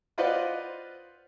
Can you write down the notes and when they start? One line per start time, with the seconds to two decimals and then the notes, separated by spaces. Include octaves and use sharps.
0.18 F4 B4 C5 D5 D#5 F#5